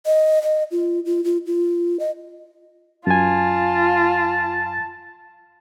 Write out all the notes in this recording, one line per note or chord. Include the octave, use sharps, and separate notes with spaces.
D#5
D#5
F4
F4
F4
F4
D#5
F#2 F4 G#5 A5